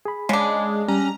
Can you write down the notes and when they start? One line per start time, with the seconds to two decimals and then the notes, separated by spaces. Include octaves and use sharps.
0.05 G#4 B5
0.29 C#3 G#3 D4
0.88 G3 C#4 A#5